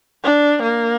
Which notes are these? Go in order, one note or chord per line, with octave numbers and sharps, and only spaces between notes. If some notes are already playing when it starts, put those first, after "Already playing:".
D4
A#3